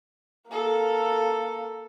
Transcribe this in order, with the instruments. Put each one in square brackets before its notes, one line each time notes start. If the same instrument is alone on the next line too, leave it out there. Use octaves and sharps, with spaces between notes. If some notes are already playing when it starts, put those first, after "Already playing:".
[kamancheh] A#3 A4